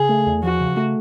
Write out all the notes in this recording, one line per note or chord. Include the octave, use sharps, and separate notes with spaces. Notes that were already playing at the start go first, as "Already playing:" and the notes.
Already playing: C#3 G#4
A3
E2
F3 F#4
C#3
A3